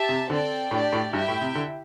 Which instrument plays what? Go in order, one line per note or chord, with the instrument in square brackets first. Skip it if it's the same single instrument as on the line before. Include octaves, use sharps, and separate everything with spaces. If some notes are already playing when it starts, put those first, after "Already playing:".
Already playing: [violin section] G4 E5 A5
[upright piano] C3
[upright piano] D3 [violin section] C4 A4 D5 G5
[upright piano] A2 [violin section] D4 G4 D5
[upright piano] A2
[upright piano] G2 [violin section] E4 G4 E5 G5
[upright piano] A2
C3
D3